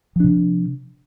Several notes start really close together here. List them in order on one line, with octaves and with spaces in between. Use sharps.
F3 D4 C3